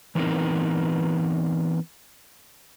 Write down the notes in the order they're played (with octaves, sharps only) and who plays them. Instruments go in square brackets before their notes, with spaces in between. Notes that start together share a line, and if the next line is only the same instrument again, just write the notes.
[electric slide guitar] E3 B3 C4 D#4 A#4